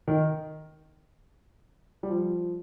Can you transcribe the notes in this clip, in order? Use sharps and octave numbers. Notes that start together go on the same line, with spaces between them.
D#3
G3
F3